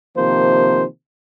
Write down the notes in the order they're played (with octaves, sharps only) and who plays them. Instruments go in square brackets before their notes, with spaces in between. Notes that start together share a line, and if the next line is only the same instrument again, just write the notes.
[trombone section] C3 D#3 F3 A#3 C5